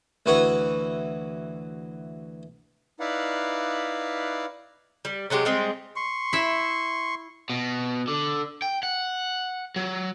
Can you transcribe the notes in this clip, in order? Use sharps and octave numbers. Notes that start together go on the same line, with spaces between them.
D2 E3 F#4 B4 C#5 F#5
D#4 E4 B4 D5 F5 F#5
G3
C3 F#3 G#3 G4
G3 G#3 C4
C6 C#6
E4 E5
B2
D3
G5
F#5
F#3